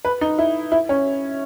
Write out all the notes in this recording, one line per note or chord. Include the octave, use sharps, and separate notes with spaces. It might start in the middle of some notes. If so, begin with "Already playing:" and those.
B4
D#4
E4
E4
C#4